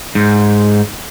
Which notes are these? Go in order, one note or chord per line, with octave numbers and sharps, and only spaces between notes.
G#2